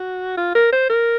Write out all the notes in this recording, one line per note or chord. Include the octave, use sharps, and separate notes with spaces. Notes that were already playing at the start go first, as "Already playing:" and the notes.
Already playing: F#4
F4
A#4
C5
A#4